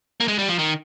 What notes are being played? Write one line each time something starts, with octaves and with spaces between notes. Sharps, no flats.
A#3
G#3
G3
F3
D#3